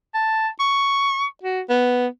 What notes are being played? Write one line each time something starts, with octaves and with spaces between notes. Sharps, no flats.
A5
C#6
F#4
B3